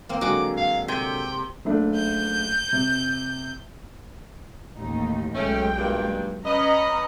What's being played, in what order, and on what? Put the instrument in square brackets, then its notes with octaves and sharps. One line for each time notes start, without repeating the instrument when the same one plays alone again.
[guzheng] A#3 C4
[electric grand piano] D3 F#3 [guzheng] G#3 F#4 [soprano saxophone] D6
[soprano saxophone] F5
[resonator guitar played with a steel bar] C3 [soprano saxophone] G5
[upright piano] F#1 A3 D4
[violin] G6
[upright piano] C3
[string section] A1 D#2 D#4
[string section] B1 G#3 G5 [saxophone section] A3 C#4
[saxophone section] G2 A#2
[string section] C#4 A#5 B5 [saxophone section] B4 D#5